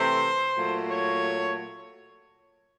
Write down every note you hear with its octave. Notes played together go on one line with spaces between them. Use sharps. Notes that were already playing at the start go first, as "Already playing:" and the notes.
Already playing: C3 E3 A3 C4 C5
A#2 F#3 A3
C#5